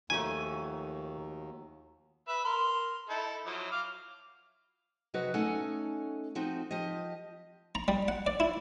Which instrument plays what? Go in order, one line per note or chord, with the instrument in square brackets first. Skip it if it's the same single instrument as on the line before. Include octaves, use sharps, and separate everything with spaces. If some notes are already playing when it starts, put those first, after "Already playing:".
[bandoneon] D#2 [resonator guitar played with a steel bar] D#3 F3 A3 [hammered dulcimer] F#3 [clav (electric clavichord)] G#5
[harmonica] B4 E5
A#4 C6
D#4 E4 A4
F3 F#3 E4
F5 D6 F6
[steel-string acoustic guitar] F2 C3 F#3 F#4 B4 D#5
A3 C#4 D#4 A4 F#5 G#5
F3 C4 D#4 F#4
F3 G4 D#5
[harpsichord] A#5
G3
F#5
D5
E4